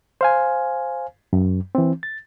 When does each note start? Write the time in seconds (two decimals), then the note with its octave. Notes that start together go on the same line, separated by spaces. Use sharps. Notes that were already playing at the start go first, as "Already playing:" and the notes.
0.21 C5 F5 G#5
1.33 F#2
1.75 E3 C4
2.03 A6